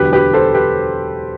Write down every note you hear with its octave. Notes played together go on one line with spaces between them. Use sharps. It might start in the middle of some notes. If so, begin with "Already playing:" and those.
Already playing: E1 D2 D3 F#3 G4 B4
G4 B4
A4 C5
G4 B4